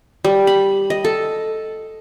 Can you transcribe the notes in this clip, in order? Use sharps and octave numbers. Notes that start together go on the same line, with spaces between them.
G3
B5
D#5
A4